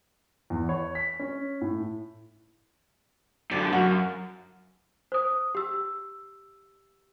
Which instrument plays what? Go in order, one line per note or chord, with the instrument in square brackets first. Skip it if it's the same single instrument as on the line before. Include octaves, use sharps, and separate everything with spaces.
[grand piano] E2
C#5
B6
C#4
A2
[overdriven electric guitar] F#2 D3 [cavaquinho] D5
[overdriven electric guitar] F#2 [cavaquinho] F#4 F5
[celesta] C5 D#6
G4 E6